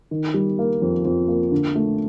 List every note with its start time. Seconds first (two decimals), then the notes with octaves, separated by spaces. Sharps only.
0.11 D#3
0.34 G3
0.59 A#3
0.82 F2
1.05 F2
1.28 A#3
1.51 D3
1.75 A3